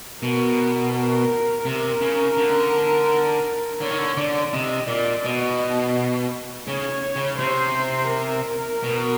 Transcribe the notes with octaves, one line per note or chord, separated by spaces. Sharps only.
B2 A#4
A#4
C3 A#4
C#3
D3
D3 C#5
D#3
D3
D3 D5
C3 D#5
A#2 D5
B2 D#5
C#3 C#5
C#3
C3 C5
A#4
B2